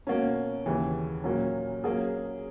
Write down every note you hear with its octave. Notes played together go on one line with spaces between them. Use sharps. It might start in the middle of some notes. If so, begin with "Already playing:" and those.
B2 A#3 C#4
D#2 C#3 E3
A#2 F#3 A#3 C#4
F#3 A#3 C#4 G#4